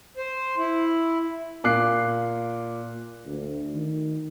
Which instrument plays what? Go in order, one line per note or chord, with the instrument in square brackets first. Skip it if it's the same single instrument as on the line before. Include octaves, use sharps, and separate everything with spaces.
[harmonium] C5
E4
[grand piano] A#2 D6 F#6 C7
[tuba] D2
D#3